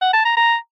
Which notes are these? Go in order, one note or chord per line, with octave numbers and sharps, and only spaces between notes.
F#5
A5
A#5
A#5